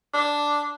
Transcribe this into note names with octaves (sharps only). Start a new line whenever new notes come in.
D4